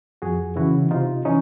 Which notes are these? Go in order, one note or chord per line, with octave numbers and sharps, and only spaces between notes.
F2 F#4 G#4
C#3 E3 E4 F#4
C3 D#4 F4
E3 C#4 D#4